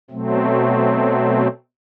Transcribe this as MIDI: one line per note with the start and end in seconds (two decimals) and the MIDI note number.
0.11 1.48 47
0.11 1.48 54
0.11 1.48 57
0.11 1.48 60